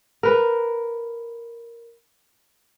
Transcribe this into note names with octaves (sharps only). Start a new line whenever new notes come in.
A#4 B4